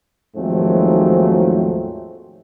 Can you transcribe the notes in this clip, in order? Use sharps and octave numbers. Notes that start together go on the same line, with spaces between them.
D#2 G#2 F3 F#3 A3 C4